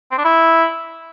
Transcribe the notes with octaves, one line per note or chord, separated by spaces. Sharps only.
C4
D4
E4